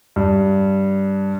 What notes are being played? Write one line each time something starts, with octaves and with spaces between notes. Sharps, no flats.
G2